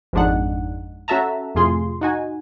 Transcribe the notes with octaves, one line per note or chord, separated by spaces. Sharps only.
G#1 F2 G#3 D4 D#4 F#5
C#4 F#4 A4 E5 A5 A#5
F2 A2 C3 F4 G#4 C6
D#4 F#4 G#5